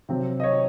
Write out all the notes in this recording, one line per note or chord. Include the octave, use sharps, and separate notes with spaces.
C3 F#3 C4
D#5
C#5